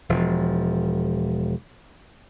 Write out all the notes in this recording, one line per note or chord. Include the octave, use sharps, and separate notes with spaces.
E1 F3